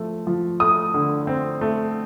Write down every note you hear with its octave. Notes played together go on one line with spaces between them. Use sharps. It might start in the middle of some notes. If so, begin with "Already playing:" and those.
Already playing: F3 A3
F3
A3 D#6
D3
C4
A3